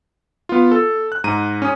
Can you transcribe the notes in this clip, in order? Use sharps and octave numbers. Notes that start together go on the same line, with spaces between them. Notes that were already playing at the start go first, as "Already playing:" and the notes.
B3 F4
A4
F#6
G#2 A#5 D#7
C#4 D#6